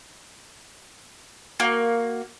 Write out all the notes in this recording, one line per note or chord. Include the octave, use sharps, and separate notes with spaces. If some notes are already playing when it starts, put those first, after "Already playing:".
A#3 F#4